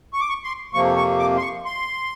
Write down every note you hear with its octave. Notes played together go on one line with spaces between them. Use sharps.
C#6
D6
C#6
C6
F2 C3 F3 A#3 C#6
C#6
D6
C6
C#6
C6